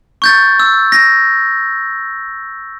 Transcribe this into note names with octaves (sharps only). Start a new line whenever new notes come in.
C#6 G6 A6
E6
A#6